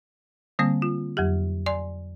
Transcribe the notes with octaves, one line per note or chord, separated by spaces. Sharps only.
D3 G3 A#3 C4
F4
F2 F#3 G4
D5 G#5 C6